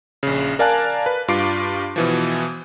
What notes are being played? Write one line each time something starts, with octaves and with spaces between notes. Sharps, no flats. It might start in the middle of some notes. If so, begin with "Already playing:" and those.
A#1 C#3
A#4 D5 F5 G#5 A5 F#6
B4
G2 F4 D6 C7 D7
B2 E3 F3